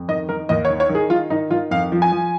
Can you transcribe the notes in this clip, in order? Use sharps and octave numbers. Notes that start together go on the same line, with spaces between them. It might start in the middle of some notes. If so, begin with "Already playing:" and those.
Already playing: F2
D#3 D#5
D#3 A#4
D#2 D#5
C#5
D#3
C#5
D#3
G#4
D#3 F4
D#3 D#4
D#3 F4
F2 F5
F3
G#5
F3